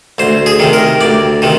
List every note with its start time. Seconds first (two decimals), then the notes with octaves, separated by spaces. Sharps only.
0.18 D2 C5
0.46 G#4
0.59 C3 D#3
0.73 A#4
1.01 D2 D5
1.42 C3 D#3